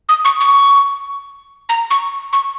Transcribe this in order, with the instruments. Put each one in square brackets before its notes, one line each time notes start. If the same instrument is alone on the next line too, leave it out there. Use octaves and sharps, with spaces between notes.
[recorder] D#6
C#6
C#6
A#5
C#6
C#6